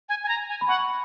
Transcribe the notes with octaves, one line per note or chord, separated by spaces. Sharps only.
G#5
G#5
A#5
G#5
B5
F#5 C#6